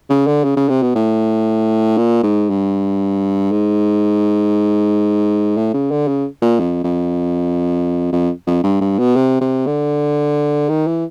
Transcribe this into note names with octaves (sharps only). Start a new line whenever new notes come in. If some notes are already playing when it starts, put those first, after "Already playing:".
C#3
D3
C#3
C#3
C3
B2
A2
A#2
G#2
G2
G#2
A2
C#3
D3
C#3
A#2
F2
F2
F2
F2
G2
G2
B2
C3
C3
D3
D#3
E3